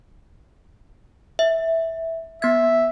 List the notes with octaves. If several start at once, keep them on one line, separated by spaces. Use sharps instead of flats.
E5
B3 E5 G#6